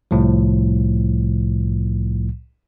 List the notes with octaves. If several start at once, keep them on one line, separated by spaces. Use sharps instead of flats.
C2 A2 F3